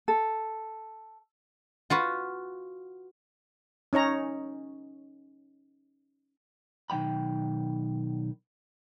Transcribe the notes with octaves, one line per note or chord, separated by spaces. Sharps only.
A4
F4 F#4 B4
C#4 D#4 C#5 A#5
B1 D#3 F#3 G5 B5